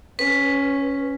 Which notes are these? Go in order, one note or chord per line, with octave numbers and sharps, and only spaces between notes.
C#4 B4